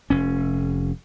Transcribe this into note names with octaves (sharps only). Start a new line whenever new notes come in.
F1 C#4